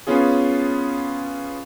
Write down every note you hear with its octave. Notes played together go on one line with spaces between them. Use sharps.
B3 C#4 F4 G#4